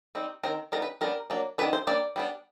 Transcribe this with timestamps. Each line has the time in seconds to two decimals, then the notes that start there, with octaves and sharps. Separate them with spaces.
0.15 G3 C4 D#4
0.43 D#3 G3 C4 A#4
0.72 G3 B3 D#4 A#4
0.82 B4
1.01 G3 B3 D4 A#4
1.30 F#3 A#3 D4
1.58 D#3 G#3 B3 D4 B4
1.73 C5
1.87 G3 A#3 D4 D5
2.16 G3 B3 D4